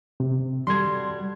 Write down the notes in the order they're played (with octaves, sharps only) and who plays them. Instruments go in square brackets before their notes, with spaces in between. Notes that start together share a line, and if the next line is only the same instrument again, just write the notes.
[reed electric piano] C3
[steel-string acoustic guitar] G3 F#4 A4 [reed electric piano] C6 G#6